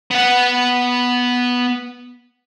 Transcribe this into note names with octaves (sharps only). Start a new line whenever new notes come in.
B3 F#5